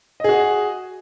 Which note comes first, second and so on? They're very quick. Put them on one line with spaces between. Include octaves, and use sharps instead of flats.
D#5 G#4 F#4